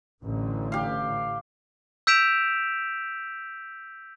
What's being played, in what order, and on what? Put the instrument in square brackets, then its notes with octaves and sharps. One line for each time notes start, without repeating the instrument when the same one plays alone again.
[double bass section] A1 D3
[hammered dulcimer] G4 F5
[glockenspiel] E6 G6 B6 D7 E7 F7